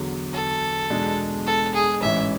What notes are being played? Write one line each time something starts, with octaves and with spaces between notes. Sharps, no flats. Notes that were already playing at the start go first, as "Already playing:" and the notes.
Already playing: E2 D3 F#3
A4
E2 B2 G#3 D4
A4
G#4
A1 G#2 E3 G#3 C#4 E5